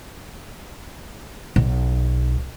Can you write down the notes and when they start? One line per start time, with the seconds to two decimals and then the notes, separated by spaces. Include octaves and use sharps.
1.56 B1